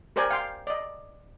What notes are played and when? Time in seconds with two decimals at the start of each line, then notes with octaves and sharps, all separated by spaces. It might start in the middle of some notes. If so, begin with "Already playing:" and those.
0.16 G4 A#4 C5 D5 G5 G#5
0.31 F5 G5 C6
0.67 D5 D#5